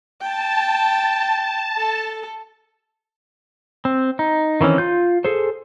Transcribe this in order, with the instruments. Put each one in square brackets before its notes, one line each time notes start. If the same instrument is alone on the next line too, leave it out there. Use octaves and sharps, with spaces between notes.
[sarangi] G5 [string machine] A5
[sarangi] A4
[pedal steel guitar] C4
D#4
D#3 E3 C4 C#4
F4 G6
G#4 A4 C5